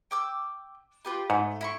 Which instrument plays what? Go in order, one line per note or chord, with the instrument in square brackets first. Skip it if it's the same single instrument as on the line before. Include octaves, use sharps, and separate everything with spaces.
[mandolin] G5 D6 E6
F4 G4 B4
[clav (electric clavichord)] G#2 [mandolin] A3
[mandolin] E4 B5 C#6